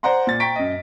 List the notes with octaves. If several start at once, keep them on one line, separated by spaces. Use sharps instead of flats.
C5 D5 F#5 A#5 C6
A#2 A6
G5 A#5 C#6 A6 B6 D7
F#2 D#5